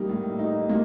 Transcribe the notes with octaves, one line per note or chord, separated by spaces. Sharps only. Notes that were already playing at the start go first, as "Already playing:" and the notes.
Already playing: G3 A#3 D#4
A2
D#4
A#3